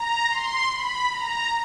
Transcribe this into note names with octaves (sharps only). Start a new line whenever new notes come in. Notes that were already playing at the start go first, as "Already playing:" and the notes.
Already playing: A#5
C6
B5
A#5